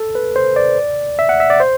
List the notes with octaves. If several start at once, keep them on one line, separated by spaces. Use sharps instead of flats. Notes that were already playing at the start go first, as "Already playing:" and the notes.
Already playing: A4
B4
C5
D5
E5
F#5
E5
D5
C5